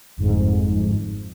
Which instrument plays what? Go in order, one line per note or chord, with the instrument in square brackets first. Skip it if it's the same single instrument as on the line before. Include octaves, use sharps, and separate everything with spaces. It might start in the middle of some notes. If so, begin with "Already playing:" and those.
[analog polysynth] G1 F2 G#2